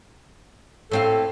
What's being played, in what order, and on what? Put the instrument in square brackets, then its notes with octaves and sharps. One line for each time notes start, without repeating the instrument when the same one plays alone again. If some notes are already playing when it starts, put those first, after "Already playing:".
[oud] A2 C4 F5 [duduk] A4